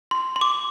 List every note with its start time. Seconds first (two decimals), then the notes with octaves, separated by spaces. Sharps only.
0.11 C6
0.36 C6
0.41 D6